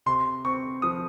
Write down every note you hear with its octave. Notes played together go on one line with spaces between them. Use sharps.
C3 C6
C4 C#6
F3 D#6